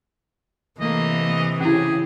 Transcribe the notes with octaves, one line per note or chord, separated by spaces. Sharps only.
C3 E3 A3 A#3 D#5
C#3 C#4 E4 G4 G#4